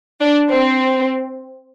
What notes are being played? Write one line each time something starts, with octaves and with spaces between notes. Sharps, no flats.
D4
C4